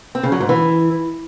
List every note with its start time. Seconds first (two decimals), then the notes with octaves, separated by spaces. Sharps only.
0.15 C4
0.23 C#3
0.32 F#3
0.40 G#2
0.49 E3